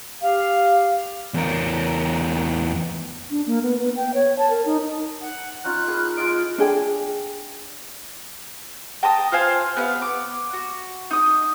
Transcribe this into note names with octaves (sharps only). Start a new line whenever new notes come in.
G4 F5
E2 A#4
D4
A#3
B3
B3
G5
C#5
A5
A#4
D#4
F#5
C#4 D#4 F4 F#6
A#3 G#4 B4
G#3 F4 D#5 D7
D4 G#4 G5
G5 A5 A#5 D#6
F4 C5 F5 G#5
B3 D#5 F5
D6
F#4
D#4 D#6